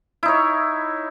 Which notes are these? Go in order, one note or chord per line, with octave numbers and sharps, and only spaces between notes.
D#4 E4 C#5